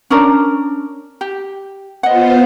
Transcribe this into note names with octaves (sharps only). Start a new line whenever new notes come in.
C#4 D4 A#4
G4
B3 F4 C5 D#5 F#5